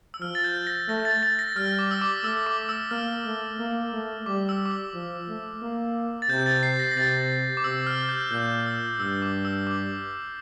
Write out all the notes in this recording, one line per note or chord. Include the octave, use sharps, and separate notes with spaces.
E6
F3 F6
A6
G6
A#6
A3 A#6
A6
A6
A#6
G3 F6
D6
E6
D6
A3 E6
D6
E6
A#3 F6
A3
A#3
A3
G3 D6
E6
D6
E6
F3
A3
A#3
A6
C3 G6
A6
C7
A#6
A#6
C3 A6
D6
C3 E6
F6
G6
A#2 G6
E6
G2 E6
D6
E6
D6